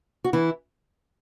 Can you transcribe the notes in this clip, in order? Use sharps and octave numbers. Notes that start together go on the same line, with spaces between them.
F#4
E3 E4